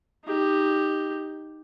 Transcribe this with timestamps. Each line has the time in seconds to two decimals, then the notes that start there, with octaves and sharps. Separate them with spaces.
0.24 D#4 G4